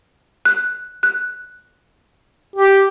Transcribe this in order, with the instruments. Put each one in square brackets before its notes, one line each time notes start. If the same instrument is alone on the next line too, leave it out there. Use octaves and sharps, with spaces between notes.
[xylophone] F#6
F#6
[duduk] G4